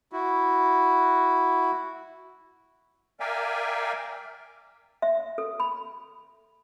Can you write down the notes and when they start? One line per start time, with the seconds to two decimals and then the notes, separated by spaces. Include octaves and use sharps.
0.12 E4 F#4
3.20 A#4 D5 E5 F5 G5 G#5
5.02 E5
5.38 A4
5.60 B5